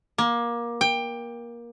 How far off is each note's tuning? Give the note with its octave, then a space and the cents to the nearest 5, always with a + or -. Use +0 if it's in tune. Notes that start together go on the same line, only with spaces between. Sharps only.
A#3 +20
G5 +20